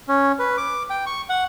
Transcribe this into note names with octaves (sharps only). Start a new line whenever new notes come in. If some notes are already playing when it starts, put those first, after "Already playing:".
C#4
B4
D6
G5
C#6
F#5